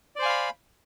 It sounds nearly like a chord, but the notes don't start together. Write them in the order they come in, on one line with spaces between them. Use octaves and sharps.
D5 C5 G#5 F5 B5